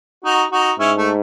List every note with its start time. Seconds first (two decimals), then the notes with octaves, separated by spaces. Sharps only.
0.24 D#4 F#4
0.52 D#4 F#4
0.79 G#2 C#4 E4
0.97 A3